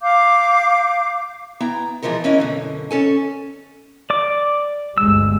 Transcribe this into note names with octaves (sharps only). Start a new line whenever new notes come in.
F5 D6 G6
B3 E4 G5 A#5
B2 E3 F3 G#3 A#4
E3 C#4 E4 A#4 D#5
F#2 B2 D3
C#4 A4 G#5
D5 D6
G1 D2 G#3 E6